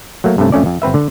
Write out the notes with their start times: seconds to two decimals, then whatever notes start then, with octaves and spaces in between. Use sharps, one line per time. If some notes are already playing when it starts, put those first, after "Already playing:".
0.24 F#3 A3 A#3
0.38 G2 C3 A3 C#4
0.52 F2 A3 C#4 D5
0.66 F2
0.82 G1 C4 B4 E5
0.94 D3